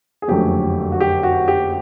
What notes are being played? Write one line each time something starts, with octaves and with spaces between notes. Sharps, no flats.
G#4
F#1 F2 D3 F#3 A3 G4
F#4
G4
F#4
G4